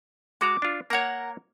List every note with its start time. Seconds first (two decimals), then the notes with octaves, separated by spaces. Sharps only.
0.41 G#3 F#4 A#5 D6
0.62 D4 F4
0.90 A#3 A#4 C#5 F#5